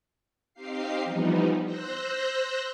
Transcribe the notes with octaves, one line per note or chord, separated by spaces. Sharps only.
C4 D#4 G4 F5 C7
E3 F3 G3 B3 D#4
C5 E6 F#6 G6 A#6